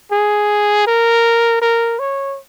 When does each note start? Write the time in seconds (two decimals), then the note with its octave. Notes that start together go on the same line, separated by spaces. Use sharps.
0.12 G#4
0.87 A#4
1.62 A#4
1.99 C#5